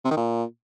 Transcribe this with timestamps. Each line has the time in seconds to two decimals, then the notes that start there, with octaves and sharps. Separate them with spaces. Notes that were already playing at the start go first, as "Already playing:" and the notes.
0.05 C3
0.11 D#3
0.17 A#2